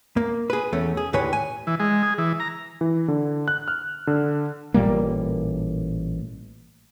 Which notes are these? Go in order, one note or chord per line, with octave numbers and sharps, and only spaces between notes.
A#3
G#4 B4
E2 A3 C#4
G#4
D#2 A2 D3 B4 C#5 G#5
G#5
E3
G#3
G#4
E3
A#5
E3
D3
F#6
F6
D3
A1 A#2 G3 A#3